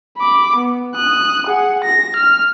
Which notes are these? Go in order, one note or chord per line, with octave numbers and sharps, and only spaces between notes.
B5 D6
B3
D#6 F#6
G#4 F#5
A#6
F6